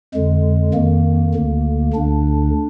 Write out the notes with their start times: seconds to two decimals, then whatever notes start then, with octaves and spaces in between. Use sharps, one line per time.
0.14 F2 D3 G#3
0.74 F2 D#3 A#3
1.34 D2 D3
1.93 D2 D3 D4